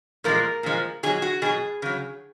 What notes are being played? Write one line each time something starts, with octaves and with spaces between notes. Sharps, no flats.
A#2 F3 G#3 A#4
A#2 F3 G#3
B2 F#3 G#4
F#4
B2 F#3 G#4
C#3 F#3